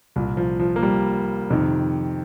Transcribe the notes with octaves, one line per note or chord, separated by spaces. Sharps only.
C2 A#2
F3
F3
A#3
G3
F2 C3 D#3